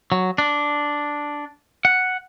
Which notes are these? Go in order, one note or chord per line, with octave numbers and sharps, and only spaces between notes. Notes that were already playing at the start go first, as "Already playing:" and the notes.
F#3
D4
F#5